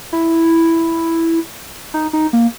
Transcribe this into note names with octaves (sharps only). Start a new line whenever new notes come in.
E4
D#4
D#4
A#3